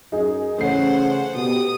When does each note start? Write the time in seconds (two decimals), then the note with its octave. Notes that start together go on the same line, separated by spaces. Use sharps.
0.12 F#2 D#4 G#4
0.58 C#3 E3 A3 C#4 C5 F#5 C7
1.35 B2 B3 G4 D#6